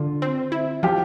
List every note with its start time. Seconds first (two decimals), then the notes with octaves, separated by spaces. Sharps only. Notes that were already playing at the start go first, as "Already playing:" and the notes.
Already playing: D3 F4
0.22 C4
0.52 E4
0.83 F3 G4